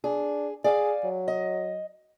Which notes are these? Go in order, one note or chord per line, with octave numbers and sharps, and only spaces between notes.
D4 G#4
G#4 D5 F5 G#5
F#3
D#5